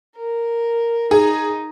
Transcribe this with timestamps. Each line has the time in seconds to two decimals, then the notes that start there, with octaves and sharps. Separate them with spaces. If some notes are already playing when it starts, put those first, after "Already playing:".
0.16 A#4
1.11 D#4 G#4